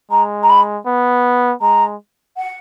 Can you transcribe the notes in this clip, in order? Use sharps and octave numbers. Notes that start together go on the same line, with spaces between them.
G#3 A#5
A#5
B5
B3
G#3 A#5
F#5